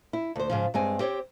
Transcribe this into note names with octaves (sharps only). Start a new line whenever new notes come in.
E4
D2 C5
G#2 C#3 F3
G2 G#3 C4 G#5
C4 G4 C5 C#5